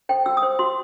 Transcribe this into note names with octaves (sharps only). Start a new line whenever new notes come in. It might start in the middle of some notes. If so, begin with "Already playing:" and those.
A4 C5 G5
F#4 E6
D#6
C5
F#4 C6